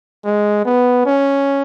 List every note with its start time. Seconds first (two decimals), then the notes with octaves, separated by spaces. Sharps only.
0.24 G#3
0.65 B3
1.06 C#4